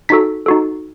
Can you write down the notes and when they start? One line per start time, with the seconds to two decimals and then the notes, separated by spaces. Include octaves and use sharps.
0.09 D#4 F#4 A4 B6
0.46 D#4 F#4 A4